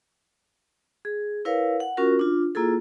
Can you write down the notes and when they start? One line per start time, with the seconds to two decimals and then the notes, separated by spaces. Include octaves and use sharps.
1.05 G#4
1.45 E4 A#4 B4 C#5 F5
1.80 F#5
1.97 C#4 F4 F#4 A#4
2.19 D4 F4
2.55 A#3 E4 F4 G#4 A4